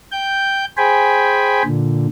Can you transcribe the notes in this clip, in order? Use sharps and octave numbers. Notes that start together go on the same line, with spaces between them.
G5 G6
G#4 C5 G5 G#5 B5
A#2 D3